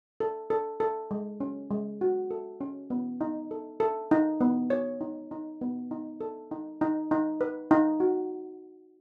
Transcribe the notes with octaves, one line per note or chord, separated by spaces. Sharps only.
A4
A4
A4
G#3
C#4
G#3
F#4
A4
C#4
B3
D#4
A4
A4
D#4
B3
C#5
D#4
D#4
B3
D#4
A4
D#4
D#4
D#4
B4
D#4
F#4